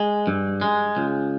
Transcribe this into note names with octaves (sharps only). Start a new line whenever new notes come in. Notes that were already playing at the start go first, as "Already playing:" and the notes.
Already playing: G#3
G2
G#3
C#2